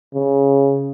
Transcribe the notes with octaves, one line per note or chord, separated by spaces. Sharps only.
C#3